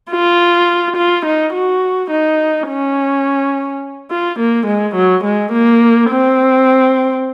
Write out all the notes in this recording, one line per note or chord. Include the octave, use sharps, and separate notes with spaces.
F4
F4
D#4
F#4
D#4
C#4
F4
A#3
G#3
F#3
G#3
A#3
C4